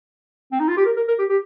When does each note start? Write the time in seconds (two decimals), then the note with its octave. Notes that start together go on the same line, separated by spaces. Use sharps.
0.52 C4
0.60 D#4
0.68 F4
0.77 G4
0.86 A#4
0.96 A#4
1.08 A#4
1.19 G4
1.29 G4